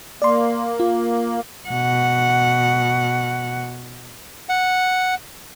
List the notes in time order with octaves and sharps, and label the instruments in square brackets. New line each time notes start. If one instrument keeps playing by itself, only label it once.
[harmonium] A#3 [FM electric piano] D5 C6
[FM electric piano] F4
[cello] B2 F#5
[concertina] F#5